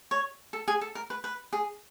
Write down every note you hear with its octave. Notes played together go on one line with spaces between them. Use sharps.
C#5
A4
G#4
A4
A#4
B4
B4
G#4